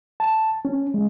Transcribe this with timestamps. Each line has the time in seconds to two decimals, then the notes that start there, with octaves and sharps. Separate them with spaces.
0.20 A5
0.65 C#4
0.94 G#3